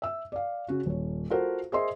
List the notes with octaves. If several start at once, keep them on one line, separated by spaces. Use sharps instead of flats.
E5 E6
D5 F5
C#3 F#4
D#1 C#5
F4 F#4 A4 A#4 C5 F#5
G#4 A#4 C5 D#5 E5 C6